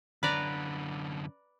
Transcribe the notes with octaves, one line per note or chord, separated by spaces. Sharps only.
F#2 D3 B4 D5 A#5